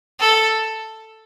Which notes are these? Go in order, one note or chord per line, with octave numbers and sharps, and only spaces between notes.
A4